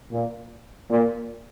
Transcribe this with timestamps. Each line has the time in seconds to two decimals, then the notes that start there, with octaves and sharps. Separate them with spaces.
0.12 A#2
0.90 A#2